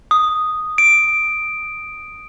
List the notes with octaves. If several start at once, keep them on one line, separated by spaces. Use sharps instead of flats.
D#6
D7